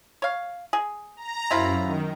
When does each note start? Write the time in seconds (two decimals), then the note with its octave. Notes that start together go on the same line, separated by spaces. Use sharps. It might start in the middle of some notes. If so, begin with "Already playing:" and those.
0.22 C#5 F5
0.73 G#4
1.17 A#5
1.51 F#2 C3 E4 F4
1.83 D#3